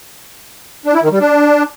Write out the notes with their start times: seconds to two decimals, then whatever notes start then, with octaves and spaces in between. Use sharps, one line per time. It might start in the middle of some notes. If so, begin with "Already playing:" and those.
0.85 D4
0.94 E4
1.03 D#3
1.12 G3
1.21 D4